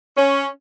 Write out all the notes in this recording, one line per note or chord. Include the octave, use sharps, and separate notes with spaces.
C#4